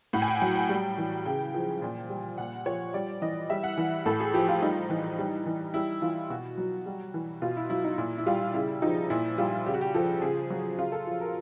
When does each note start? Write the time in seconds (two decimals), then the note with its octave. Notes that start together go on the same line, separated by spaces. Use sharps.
0.13 A2 F#5
0.22 G#5
0.28 G5
0.42 F#3 F#5
0.56 G5
0.69 G3
0.98 E3
1.26 C#3 G5
1.55 F3
1.82 A#2
2.10 G3
2.38 A#2 F#5
2.66 F3 C#5
2.94 G3 D5
3.22 E3 D#5
3.50 G3 E5
3.63 F#5
3.78 E3
4.06 A2 A4
4.20 G#4
4.34 F3 G4
4.48 F4
4.62 G3 D#4
4.90 E3
5.18 G3
5.46 E3
5.74 G3 E4
6.02 E3 F4
6.30 B2 F#4
6.58 F#3
6.86 G3
7.14 E3
7.42 B2 F4
7.57 E4
7.70 F#3 E4
7.84 D#4
7.98 A#2 E4
8.18 E4
8.26 G3 F4
8.54 C#3 E4
8.82 F3 D#4
9.10 A#2 E4
9.38 G3 F4
9.66 C#3 G4
9.74 F#4
9.81 G4
9.94 F3 A4
10.22 C#3 G#4
10.50 F#3 F#4
10.78 C#3 F4
10.92 A4
11.07 F3
11.21 A#4